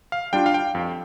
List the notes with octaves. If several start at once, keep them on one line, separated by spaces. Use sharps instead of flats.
F5
G3 D4 F4 G5
F5
G5
F2